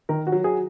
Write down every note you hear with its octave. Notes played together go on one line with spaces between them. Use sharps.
D#3 A#4
F#4
F#3
G#4